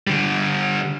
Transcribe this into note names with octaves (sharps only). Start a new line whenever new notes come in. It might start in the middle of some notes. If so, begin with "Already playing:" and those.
D3 G3